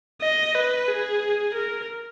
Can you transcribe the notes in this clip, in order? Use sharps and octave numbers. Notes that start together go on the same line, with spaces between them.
D#5
B4
G#4
A#4